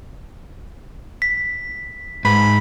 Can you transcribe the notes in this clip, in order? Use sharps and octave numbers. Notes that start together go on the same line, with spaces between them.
B6
G#2 B5